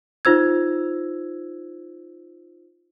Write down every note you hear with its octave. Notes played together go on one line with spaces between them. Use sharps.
D#4 F4 C5 E6 G#6